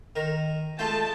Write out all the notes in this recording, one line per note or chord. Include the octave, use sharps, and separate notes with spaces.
D#3 A#4
G#3 A3 F4 G5 A5